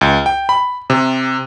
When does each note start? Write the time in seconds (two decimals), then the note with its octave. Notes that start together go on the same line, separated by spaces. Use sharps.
0.01 C#2
0.26 G5
0.49 B5
0.90 C3